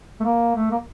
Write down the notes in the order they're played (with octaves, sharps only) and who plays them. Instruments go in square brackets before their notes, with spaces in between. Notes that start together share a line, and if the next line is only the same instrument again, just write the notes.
[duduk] A3
A#3
A3
A#3